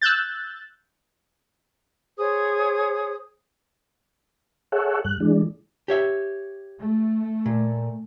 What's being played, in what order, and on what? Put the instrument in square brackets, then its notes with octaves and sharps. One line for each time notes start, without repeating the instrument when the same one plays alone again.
[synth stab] E6 F#6 G6 A6
[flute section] G#4 C5 C#5 D#6
[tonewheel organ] G#4 A4 C#5 E5 F#5
G2 F#6
E3 G#3 D4
[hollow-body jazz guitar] G4 C#5 E5
[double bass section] A3
[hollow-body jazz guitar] A#2